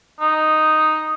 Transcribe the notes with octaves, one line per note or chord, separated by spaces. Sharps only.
D#4